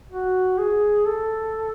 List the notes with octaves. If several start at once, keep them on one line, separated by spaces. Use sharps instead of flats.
F#4
G#4
A4